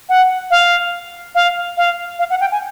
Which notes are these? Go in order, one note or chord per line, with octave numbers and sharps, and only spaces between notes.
F#5
F5
F5
F5
F5
F#5
G5
G#5